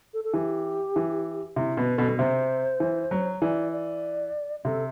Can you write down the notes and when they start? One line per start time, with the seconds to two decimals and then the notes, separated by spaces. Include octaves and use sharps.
0.14 A4
0.24 A4
0.34 E3 G4
0.96 E3
1.56 C3 E4
1.77 B2 B4
1.98 B2 A4
2.08 B2
2.18 C3 C5
2.80 E3
3.11 F#3
3.42 E3 D5
3.72 D5
4.65 C3 A4